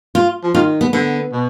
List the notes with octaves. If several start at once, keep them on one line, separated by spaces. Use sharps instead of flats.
F4
F3
D#3 F4
B3
D3 B3
B2